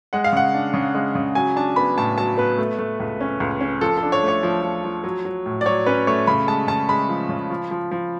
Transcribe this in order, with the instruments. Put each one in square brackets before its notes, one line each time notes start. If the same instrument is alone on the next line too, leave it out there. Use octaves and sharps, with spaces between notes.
[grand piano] G#3 F#5
F5
C#3 F#5
D4
C#3
G#3
C#3
F#3 G#5
D4 A5
B3 B5
A2 A5
F#3 A5
B3 B4
A3
A3
C#2
C#4
C#2
C#4
F3 A4
A4
D4
C#5
A3
C#5
F3
F3
F3
F#3
F#3
A2
D5
F#3 C#5
C#4 B4
A3 C#5
C#3 B5
G#3 A5
C#3 A5
G#3 B5
F3
C#3
F3
F3
F3